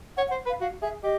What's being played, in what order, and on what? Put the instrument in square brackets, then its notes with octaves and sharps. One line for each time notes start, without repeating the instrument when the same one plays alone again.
[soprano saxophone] C#5 [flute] F#5
[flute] F#5
[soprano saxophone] C5
B4
[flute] F5
[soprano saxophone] F#4 [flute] F5
[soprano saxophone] G#4 [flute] E5
[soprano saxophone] G4 [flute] D#5